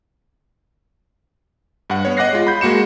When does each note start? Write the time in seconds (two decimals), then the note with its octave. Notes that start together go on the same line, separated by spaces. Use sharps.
1.90 G2 F#5
2.05 B3 C#5
2.17 D#5 F#5 D6 F#6 A#6 C7
2.33 G#3 F4
2.47 B5 G6
2.61 G#3 A#3 F#4 C#7 E7